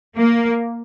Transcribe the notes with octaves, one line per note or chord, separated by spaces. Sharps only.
A#3